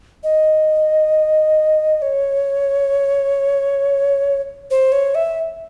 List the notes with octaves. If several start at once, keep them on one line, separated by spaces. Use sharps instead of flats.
D#5
C#5
C5
C#5
E5